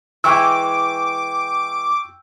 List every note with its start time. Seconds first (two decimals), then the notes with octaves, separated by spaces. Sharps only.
0.24 E3 G#3 G5 C#6 D6 E6